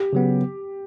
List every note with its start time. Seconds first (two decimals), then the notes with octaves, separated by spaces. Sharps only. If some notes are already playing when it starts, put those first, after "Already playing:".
Already playing: G4
0.13 C#3 F#3 B3